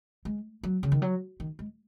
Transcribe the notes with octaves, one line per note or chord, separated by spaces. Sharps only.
G#3
F#3
C#3
D#3
F#3
D#3
G#3